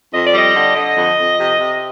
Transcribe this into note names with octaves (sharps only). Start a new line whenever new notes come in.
F2 D#5
D5
G3 D#5
D3
D3 D#5
F2
F2
C3
C3